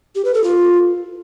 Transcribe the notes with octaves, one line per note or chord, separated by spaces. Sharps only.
G4
B4
A4
F4